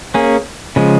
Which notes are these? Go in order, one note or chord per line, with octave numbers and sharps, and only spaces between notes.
A#3 C#4 G#4
C#3 F3 G#3